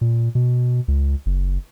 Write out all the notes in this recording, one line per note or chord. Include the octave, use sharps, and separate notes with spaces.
A#2
B2
C#2
F#1